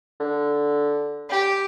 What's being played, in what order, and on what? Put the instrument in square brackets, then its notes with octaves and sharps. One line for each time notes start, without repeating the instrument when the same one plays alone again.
[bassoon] D3
[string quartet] G4